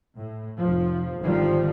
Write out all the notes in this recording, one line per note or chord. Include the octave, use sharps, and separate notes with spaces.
A2
F1 F3
G#1 D3 D#3 F3 G3